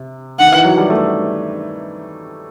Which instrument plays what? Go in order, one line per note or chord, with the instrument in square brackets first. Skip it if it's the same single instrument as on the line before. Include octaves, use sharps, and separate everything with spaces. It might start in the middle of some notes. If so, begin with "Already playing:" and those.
Already playing: [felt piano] C3
[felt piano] D#3 [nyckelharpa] F#5
[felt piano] E3
F#3
G3
A3